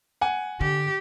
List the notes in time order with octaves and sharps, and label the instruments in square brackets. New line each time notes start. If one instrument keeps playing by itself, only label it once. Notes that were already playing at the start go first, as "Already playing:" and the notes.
[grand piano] F#5 G#5
[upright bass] D3 [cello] G4